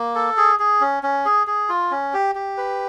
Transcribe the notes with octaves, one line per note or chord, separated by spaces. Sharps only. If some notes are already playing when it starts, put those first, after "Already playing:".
Already playing: A#3
A4
G#4
G#4
C#4
C#4
G#4
G#4
F4
C#4
G4
G4
B4